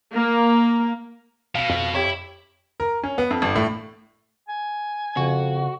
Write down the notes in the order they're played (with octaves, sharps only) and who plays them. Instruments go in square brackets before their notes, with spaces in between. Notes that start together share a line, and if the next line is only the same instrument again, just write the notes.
[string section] A#3
[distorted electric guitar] B2 [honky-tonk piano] F5 D7
[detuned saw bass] F2
[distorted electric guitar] E4 [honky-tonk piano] G4 C#5
[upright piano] A#4
C#4
B3
F2
G1
A2
[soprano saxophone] G#5
[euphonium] F2 [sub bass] C#3 [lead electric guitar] F#4